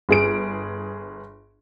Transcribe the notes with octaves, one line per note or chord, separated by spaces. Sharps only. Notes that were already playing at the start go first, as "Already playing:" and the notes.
G1 G#4 D7